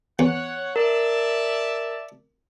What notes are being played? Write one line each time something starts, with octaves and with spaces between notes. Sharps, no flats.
E2 C#5 F#5
A#4 D5 E5 A5